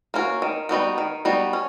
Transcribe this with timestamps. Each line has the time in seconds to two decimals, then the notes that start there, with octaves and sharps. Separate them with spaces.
0.14 A#3 C#4 F#4
0.42 D#3
0.69 G3 B3 D#4 F#4
0.98 D#3
1.25 G3 B3 D#4 F#4
1.53 C#4